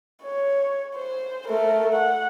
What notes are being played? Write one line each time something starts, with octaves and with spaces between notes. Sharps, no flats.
C#5
C5
A3 A#4
F#5